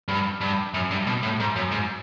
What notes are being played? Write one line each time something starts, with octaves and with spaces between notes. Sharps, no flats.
G2
G2
F#2
G2
B2
A2
G#2
F#2
G#2